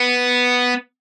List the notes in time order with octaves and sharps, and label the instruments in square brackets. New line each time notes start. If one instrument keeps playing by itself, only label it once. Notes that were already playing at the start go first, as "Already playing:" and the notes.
Already playing: [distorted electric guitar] B3